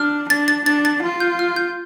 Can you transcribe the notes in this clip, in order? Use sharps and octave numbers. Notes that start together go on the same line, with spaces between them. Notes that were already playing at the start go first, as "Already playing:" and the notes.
Already playing: D4 F6
D4 A6
A6
D4 A6
A6
F4
G6
F6
G6